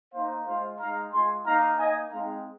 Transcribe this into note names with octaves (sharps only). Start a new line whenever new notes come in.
A#3 D#4 C5 F5
G#3 F4 C5 F5
G#3 D#4 F5 A#5
G#3 F4 G#5 C6
A#3 D#4 F5 A#5
A#3 D#4 D#5 G#5
G#3 C4 D#4 F5 A#5